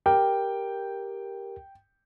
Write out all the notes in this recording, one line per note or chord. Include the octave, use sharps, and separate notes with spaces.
G4 A#4 G5